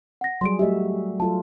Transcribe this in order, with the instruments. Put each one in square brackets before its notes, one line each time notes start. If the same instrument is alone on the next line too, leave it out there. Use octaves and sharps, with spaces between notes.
[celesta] F#5 A#6
[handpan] F#3 G3 G#4 [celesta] C6 D7
[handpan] A3 F#4 E5 [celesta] G4 D#5
[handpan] F#3 F4 A4 [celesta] A5